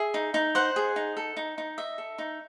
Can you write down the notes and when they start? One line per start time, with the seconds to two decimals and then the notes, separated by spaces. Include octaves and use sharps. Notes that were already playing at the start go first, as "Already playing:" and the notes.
Already playing: G#4 E5
0.14 D#4
0.34 D#4
0.55 C5 F#5
0.76 G#4
0.96 D#4
1.17 A4
1.37 D#4
1.58 D#4
1.78 D#5 E5
1.98 A4
2.18 D#4